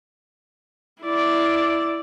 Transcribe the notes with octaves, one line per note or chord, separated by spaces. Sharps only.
E4 D5